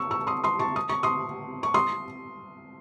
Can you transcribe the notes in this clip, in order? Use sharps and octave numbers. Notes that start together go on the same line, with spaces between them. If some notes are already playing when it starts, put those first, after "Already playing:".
Already playing: C#6 E6
C#6 E6
C6 D#6
C6 D#6
A5 C#6
D#6
C#6
C6 D#6
C#6
C6 D#6